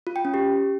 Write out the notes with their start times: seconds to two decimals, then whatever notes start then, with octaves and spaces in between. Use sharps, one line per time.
0.07 F4
0.16 G5
0.25 C#4
0.34 G4